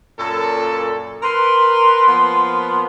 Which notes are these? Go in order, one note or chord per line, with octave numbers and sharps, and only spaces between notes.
F#2 A#2 A4
A#4 B4 C6
F3 A#3 B3